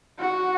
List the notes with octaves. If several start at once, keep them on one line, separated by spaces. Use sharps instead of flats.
F#4